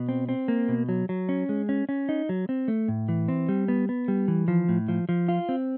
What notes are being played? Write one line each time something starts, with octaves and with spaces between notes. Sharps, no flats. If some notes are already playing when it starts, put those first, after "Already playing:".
Already playing: B2
C4
C4
A#3
B2
F#3
F#3
C#4
G#3
C#4
C#4
D#4
F#3
C4
A3
A2
E3
C4
G3
B3
B3
G3
E3
F3
A2
F3
F3
F4
C4